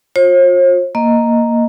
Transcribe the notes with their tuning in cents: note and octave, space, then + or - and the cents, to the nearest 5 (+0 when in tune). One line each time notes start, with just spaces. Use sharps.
F4 +35 C5 +45
A#3 +0 D#5 +0